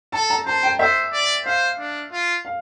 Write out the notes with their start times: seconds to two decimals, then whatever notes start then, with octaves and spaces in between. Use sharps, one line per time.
0.12 A4 A5
0.30 A#5
0.46 C5 A5
0.63 G5
0.79 C5 E5
1.13 D5
1.45 C5 F5
1.79 D4
2.12 F4
2.45 F5